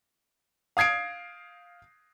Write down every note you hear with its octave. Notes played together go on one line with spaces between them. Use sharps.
F5 D#6 G#6 C7 D7